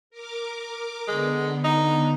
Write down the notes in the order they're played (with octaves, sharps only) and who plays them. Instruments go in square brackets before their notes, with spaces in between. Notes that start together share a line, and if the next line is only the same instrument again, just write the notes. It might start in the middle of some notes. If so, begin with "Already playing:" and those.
[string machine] A#4 D6
[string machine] D3 B3 [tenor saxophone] G#3
[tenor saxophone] D#4